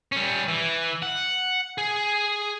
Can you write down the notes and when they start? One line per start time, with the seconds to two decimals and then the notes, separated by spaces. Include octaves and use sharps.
0.12 G3 C#4
0.48 E3
1.03 F#5
1.78 G#4